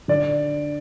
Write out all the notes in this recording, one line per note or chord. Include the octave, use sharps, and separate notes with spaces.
D3 D5